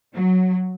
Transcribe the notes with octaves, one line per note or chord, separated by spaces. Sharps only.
F#3